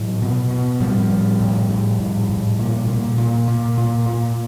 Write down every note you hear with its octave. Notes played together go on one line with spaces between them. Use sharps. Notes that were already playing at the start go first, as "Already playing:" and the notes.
Already playing: A2 E3 F#3
B2
B2
A2 F3 G3
A2
A2
A2
A2
A2
A#2
A#2
A#2
A#2
A#2
A#2